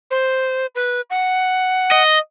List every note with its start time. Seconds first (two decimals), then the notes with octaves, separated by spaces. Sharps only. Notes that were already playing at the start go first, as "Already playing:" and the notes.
0.11 C5
0.75 B4
1.10 F#5
1.91 D#5